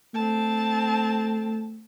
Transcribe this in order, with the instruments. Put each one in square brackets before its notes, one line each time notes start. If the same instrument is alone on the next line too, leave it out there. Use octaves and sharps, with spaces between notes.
[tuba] A3 [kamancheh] C4 A5